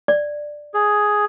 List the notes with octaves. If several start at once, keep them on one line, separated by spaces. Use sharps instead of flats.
D5
G#4